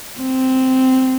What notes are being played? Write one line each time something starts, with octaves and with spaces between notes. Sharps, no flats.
C4